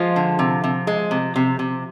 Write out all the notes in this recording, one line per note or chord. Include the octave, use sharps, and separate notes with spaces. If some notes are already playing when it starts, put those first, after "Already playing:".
Already playing: F3 G#3 F4
D3
C3
C3
G#3
C3
C3
C3